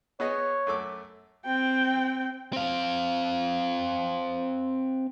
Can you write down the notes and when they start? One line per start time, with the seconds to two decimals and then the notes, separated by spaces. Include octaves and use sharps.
0.20 B3 G#4 C#5 D#5
0.67 F#2 A3 D6
1.46 C4 G5
2.53 C4 F5